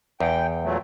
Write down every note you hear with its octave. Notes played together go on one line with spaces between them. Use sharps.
E2 G5
A#2 F#3 A3